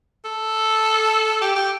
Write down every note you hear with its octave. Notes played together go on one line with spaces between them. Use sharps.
A4
G4
G4